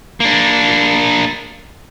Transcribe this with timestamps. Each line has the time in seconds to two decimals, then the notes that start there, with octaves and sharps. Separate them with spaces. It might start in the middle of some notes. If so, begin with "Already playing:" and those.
0.20 A#3 D4